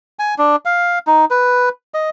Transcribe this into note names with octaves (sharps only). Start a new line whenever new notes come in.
G#5
D4
F5
D#4
B4
D#5